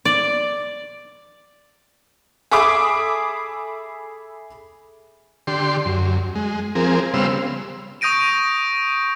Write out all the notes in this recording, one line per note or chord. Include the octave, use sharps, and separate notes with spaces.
D5
G#4 A4 E5 B5 D6 D#6
D3 G4 C6
F#2
G#3
F3 C4 G#4 A#4
C#3 G3 B3 C5 F5 E6
C#6 D#6 G6 A#6 D7 D#7